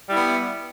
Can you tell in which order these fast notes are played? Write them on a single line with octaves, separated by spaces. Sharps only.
G3 E4 B3